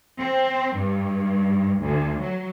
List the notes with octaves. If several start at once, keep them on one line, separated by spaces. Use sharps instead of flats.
C4
G2
D2
F#3